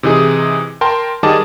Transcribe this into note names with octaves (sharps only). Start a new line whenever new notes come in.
C3 E3 D#4 G#4
A#4 G5 A5 C6
D#3 G3 G#4 D#5 A5 D6